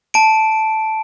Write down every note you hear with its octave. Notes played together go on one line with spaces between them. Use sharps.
A5 D7